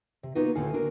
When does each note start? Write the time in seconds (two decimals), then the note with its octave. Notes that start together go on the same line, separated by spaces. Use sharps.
0.23 C3
0.35 A#3 B3 D#4 F4 F#4 B4
0.55 D2 A2 D3 A4 F5 G#5
0.73 D4 F#4 A#4